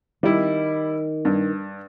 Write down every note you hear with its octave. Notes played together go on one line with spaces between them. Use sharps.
D#3 G3 E4
G2